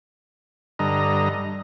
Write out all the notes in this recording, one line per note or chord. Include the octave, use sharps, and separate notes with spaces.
G2 D3 D#5 A#5